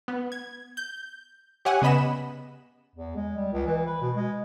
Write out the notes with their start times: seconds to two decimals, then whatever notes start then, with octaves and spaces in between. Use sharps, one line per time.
0.08 B3
0.32 G#6
0.77 G6
1.65 G4 C#5 E5 F#5 G#5
1.82 C#3 B3 D#5 B5 E7
2.96 E2
3.16 G#3
3.37 G3
3.53 C#2
3.66 E3
3.87 B4
4.01 B2
4.16 G#3